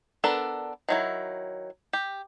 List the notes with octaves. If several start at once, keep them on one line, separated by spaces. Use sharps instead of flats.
B3 D4 A4 A#4
D#3 F#3 E4
G4